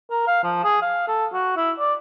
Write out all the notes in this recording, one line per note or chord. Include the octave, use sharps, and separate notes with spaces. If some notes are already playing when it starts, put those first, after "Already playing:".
A#4
F5
F3
G#4
F5
A4
F#4
E4
D5